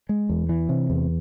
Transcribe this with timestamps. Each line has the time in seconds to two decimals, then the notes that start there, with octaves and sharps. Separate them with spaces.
0.09 G#3
0.29 E2
0.49 E3
0.69 C3
0.90 E2